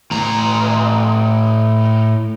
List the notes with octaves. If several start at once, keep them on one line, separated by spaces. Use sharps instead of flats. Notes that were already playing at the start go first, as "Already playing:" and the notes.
A2 A#5